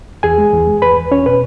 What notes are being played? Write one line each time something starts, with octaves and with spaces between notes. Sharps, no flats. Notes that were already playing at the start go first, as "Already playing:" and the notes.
E2 G#4 G#5
G#3
E2
G#3
E2 B4 B5
E2
E2 C#4 C#5
B2 B4